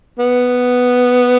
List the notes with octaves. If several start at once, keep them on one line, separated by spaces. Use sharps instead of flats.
B3